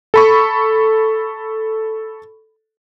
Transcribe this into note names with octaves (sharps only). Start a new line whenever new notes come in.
A4 B5 C#6